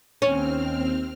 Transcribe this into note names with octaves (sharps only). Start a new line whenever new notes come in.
D#2 C4 C#4 F6